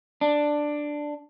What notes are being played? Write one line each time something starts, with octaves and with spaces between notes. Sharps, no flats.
D4